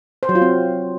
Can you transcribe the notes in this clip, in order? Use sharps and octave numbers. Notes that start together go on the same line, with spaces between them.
C5
F#3
F4
C4